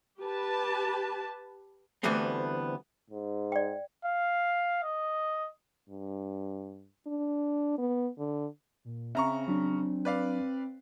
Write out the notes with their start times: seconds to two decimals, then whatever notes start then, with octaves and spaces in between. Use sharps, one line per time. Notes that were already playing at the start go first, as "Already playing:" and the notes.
0.20 G4 B4 A5
2.03 D2 E3 G3 A3 B3 C4
3.10 G#2
3.52 D5 G5
4.05 F5
4.84 D#5
5.89 G2
7.07 D4
7.78 B3
8.19 D3
8.85 A#2
9.15 C#3 C4 E5 A#5 C#6
9.48 F#3 D4
10.05 B4 D5 F5